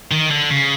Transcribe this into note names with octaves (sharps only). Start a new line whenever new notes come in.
D#3
D3
C#3